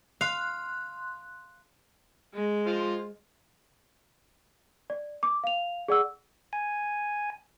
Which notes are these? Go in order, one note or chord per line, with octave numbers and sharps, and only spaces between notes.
F5 C6 F#6
G#3
F4 C5
D5
D6
F5 F7
G#4 D5 F#5 E6
G#5